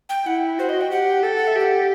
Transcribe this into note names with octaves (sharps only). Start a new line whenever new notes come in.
G5
E4 F#5
F#4 C5
D#5
G5
G4 F#5
A4 G5
F#5
E5
G4 F#5